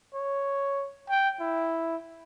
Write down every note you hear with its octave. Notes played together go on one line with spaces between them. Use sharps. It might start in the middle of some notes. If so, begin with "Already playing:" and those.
C#5
G5
E4